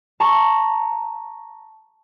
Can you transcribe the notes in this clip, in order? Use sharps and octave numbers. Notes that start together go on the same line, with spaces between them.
A5 A#5 C#6